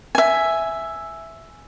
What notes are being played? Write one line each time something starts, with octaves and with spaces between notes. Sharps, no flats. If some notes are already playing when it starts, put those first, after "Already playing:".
E5 G#5